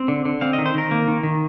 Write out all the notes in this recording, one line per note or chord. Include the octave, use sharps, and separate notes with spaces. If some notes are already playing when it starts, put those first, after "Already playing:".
Already playing: C4
D3
D3
C4 F5
D#5
D#3
C5
D#3 A#4
A#3
D#3
D#3